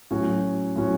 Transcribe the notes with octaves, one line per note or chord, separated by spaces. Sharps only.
A2 F#3 C#4 F#4
A2 F#3 C#4 F#4